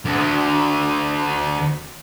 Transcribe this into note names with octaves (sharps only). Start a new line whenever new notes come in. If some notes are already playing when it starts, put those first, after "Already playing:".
D2 D3